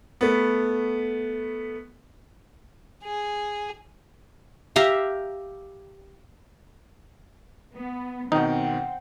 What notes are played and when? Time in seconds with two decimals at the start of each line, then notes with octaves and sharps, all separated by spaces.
0.21 A3 B3
3.04 G#4
4.76 G4 E5 F5 A#5
7.76 B3
8.32 B2 D#3 C4 D#4 F#5 G5